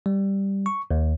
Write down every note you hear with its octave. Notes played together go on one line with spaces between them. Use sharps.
G3
C#6
D#2